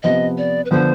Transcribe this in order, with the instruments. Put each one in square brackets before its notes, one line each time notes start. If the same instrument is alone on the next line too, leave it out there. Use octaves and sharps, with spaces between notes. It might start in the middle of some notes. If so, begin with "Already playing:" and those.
[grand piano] C3 F3 B3 [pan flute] D#5
[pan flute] D5
B4
[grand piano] D3 F3 B3 [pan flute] C5